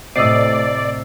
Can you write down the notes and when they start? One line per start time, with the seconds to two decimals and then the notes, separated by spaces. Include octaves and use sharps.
0.16 A2 C3 D5 D#5 D#6 E6 C7